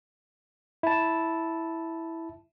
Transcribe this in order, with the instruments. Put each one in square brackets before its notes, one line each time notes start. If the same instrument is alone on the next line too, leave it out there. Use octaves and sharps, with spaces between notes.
[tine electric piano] E4 A5